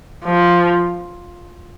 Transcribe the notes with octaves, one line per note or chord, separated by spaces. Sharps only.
F3